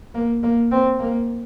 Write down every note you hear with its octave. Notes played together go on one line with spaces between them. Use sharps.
A#3
A#3
C4
A#3